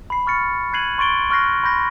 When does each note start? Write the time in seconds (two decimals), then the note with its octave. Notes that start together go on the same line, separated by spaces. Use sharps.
0.10 B5 C7
0.27 C#6 F6 A6 C#7
0.73 B5 F#6 G#6 C7 D#7 F#7
0.98 C6 C#6 A6 D7 G7
1.30 C#6 F6 F#6 A#6 C7
1.64 B5 C6 G6 A#6